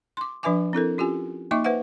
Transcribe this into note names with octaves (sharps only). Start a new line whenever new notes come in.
C6 D6
F3 D4 B4 E5 G#5 D6
C4 E4 A4 A#4
C#4 F4 G4 G#5
A#3 D#4 D#5 E5 C#6 D6
B4 C5 E5 F#5